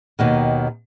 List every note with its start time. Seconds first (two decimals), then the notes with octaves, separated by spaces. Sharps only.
0.19 D#2 B2 D#3